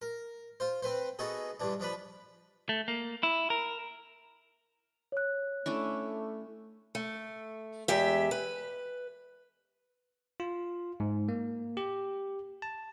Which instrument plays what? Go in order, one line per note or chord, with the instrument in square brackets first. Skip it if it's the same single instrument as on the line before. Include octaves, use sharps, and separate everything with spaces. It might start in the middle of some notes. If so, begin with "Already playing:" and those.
[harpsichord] A#4
F4 C5
C4 B4 C5
B3 D#4 F#4 G#4 A4
G2 E3 D4
F3 D4 B4 B5
[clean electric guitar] A3
A#3
E4
A#4
[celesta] C#5 F#6
[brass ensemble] A3 [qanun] C#4 D4 E4
[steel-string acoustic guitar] A3
E2 G#3 G4 E5
B4
[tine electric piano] F4
G#2
A#3
G4
A5